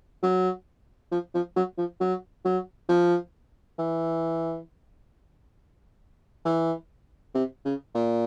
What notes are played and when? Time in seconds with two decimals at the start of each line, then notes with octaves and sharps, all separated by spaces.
0.23 F#3
1.12 F3
1.35 F3
1.56 F#3
1.78 F3
2.01 F#3
2.45 F#3
2.89 F3
3.79 E3
6.45 E3
7.35 C3
7.65 C#3
7.95 A#2